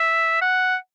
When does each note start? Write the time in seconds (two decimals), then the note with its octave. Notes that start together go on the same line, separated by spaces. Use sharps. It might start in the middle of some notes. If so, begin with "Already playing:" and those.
Already playing: E5
0.42 F#5